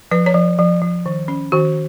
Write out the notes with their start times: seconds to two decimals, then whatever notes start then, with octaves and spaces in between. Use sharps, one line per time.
0.11 F3 B4
0.26 C#5
0.34 F3
0.59 F3
0.82 F3
1.06 D#3
1.28 C#4
1.52 D#3 F#4